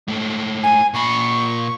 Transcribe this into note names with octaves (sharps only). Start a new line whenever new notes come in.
G#2 A3
G#5
A#2 B5 C#6